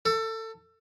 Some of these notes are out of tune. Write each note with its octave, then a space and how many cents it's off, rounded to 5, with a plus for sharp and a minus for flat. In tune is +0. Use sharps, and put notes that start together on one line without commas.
A4 +25